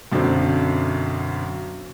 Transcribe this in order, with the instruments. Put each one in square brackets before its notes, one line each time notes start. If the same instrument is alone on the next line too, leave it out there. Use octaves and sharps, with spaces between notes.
[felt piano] B1 F#2 D3 C4